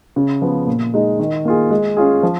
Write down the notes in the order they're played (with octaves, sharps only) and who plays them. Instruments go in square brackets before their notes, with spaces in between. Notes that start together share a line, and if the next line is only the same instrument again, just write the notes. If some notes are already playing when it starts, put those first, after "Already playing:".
[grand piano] C#3
F3 B3
A#2
G#3 D#4
D#3
A#3 F4 G#4
G#3
C#4 F4 G#4
F3